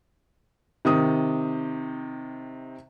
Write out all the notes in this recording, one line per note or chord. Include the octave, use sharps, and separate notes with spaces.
C3 D#3 D#6